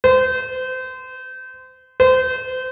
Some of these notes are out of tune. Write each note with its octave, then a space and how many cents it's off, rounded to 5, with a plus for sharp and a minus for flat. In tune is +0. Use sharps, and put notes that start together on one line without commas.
C5 -30
C5 -30